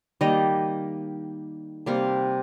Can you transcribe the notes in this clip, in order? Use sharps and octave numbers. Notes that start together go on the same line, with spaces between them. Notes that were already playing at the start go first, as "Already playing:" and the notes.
D#3 G3 A#3 D#5
C3 G3 A#3 F5